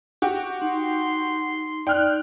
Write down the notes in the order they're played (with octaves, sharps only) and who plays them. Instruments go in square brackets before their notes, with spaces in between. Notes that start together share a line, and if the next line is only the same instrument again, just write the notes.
[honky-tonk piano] F#4 G4
[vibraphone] D#4 [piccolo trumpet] C6
[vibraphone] D#4 D5 [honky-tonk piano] G5 F6 F#6